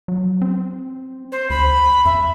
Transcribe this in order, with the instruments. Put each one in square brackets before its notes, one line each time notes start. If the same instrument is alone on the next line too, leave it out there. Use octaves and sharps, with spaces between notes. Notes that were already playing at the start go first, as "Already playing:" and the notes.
[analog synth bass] F#3
C4
[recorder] C5
[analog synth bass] D2 [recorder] B5
[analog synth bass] F2 [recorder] E5